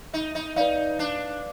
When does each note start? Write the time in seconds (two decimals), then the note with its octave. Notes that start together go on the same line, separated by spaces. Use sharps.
0.14 D#4
0.35 D#4
0.56 D#4 B4 D5 F5
0.99 D4